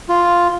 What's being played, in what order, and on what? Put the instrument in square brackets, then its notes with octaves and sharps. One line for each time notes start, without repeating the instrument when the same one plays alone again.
[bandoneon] F4